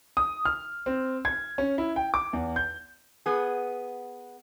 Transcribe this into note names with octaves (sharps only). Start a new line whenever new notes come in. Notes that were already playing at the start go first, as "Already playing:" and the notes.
D#6
F6
C4
G#6
C#4
E4
G5
D6
E2
G6
B3 G#4